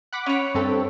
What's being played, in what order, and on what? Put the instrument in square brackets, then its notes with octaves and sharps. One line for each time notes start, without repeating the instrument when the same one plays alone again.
[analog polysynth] F#5 B5 D6
[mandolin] C#4 C#5
[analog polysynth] G2 C4 A4